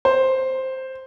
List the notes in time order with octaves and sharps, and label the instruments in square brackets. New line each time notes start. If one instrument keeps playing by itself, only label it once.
[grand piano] C5